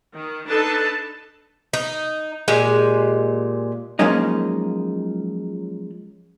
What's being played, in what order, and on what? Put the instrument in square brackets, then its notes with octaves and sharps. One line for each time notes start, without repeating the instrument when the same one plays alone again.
[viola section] D#3
D4 D#4 A4 B4 A5
[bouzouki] D#4
A#2 G#3 G4 G#5
[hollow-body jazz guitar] F3 F#3 G#3 A#3 C#4 D#4